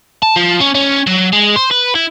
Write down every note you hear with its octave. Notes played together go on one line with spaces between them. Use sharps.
A5
F3
C#4
C#4
F#3
G#3
C5
B4
E4